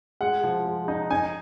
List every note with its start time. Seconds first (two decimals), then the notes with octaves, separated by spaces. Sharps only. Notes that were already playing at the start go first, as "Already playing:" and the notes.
0.21 G#3 F#5
0.44 F3
0.66 G#3
0.88 D#4
1.11 D#4 G#5